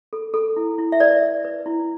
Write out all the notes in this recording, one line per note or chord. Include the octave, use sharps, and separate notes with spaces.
A4
A4
E4
E4
E5
B4 D5
B4
B4
E4